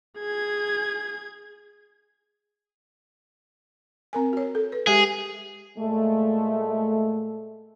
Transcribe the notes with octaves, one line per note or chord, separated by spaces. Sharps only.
G#4 G#6
C4 A#4 G#5
F#4 C#5
A4
B4
G#3 G4 G#4 E5
A#2 G#3 A3